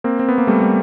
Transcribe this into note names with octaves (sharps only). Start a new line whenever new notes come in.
A#3 C4
C4
B3
A#3
G3 A3
G3